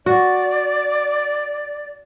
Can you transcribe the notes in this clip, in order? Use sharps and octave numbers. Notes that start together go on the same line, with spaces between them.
F#4 D5